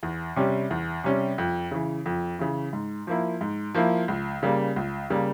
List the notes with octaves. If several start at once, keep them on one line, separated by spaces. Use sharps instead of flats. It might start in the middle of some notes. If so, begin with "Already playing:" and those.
E2
C3 G3 C#4
E2
C3 G3 C#4
F2
C#3 E3
F2
C#3 E3
G#2
F3 A#3 E4
G#2
F3 A#3 E4
C#2
C#3 G3 A#3
C#2
C#3 G3 A#3